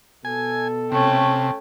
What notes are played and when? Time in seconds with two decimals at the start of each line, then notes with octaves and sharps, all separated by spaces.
0.25 B2 A4 G#5
0.92 C3 A3 C#4 G5 A5